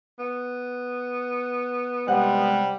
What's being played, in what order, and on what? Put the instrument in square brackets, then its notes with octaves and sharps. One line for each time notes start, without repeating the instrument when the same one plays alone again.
[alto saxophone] B3
[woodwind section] C3 G#3 [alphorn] G3 [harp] F#5